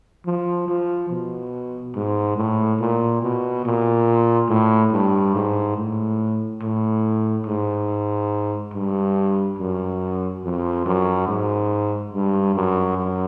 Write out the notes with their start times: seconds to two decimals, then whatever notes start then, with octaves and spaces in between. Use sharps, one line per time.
0.26 F3
0.68 F3
1.10 B2
1.95 G#2
2.37 A2
2.80 A#2
3.22 B2
3.65 A#2
4.49 A2
4.92 G2
5.35 G#2
5.77 A2
6.62 A2
7.46 G#2
8.74 G2
9.58 F#2
10.44 F2
10.86 F#2
11.28 G#2
12.13 G2
12.55 F#2
12.97 F#2